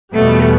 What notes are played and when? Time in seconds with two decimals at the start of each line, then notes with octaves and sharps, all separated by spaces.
0.14 E2 B2 G3 A3 B3